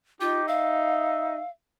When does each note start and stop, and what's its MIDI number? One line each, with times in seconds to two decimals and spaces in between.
0.21 1.40 63
0.21 0.42 65
0.21 0.46 67
0.48 1.48 76
0.48 1.50 77